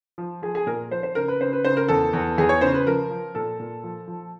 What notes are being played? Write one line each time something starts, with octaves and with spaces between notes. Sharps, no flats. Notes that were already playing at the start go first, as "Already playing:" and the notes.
F3
F3 G#4
G#4
A#2 A#4
F3 C5
C5
C#3 A#4
B4
C#3 C5
B4
C#3 C5
A#4
E2 A4
E2
E2 G#4
C#5
C#3 C5
B4
F3 A#4
F3
A#2 A4
A#2
F3
F3